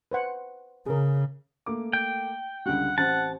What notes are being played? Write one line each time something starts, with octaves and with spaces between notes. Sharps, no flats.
B4 C5 F#5
C#3 G#4 A#4
A3 A#3 D6
G5
C#2 D3 G3 F#5
A1 C4 F#5 A5